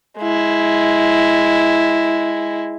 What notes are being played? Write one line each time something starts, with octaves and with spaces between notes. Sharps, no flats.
G#3 E4